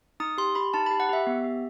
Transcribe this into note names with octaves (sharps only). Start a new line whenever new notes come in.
D#4 D#6
G4 C6
G4 B5
D#4 A5
G4 B5
F#5
G4 E5
B3
G4